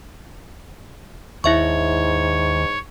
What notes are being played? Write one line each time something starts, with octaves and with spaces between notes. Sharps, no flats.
D#2 G#2 E4 C#5 E5 C#6